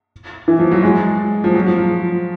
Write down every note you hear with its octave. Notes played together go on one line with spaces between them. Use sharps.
E3
F3
F#3
G#3
F3
F#3
F3
F3